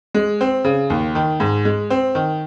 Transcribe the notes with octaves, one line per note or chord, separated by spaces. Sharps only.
G#3
C4
C#3
D#2
D#3
G#2
G#3
C4
D#3